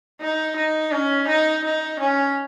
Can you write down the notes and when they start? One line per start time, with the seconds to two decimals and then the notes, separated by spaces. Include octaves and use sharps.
0.21 D#4
0.56 D#4
0.92 C#4
1.27 D#4
1.64 D#4
1.99 C#4